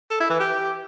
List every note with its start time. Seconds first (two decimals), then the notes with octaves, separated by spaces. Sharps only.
0.10 A4
0.20 E4
0.30 E3
0.40 G4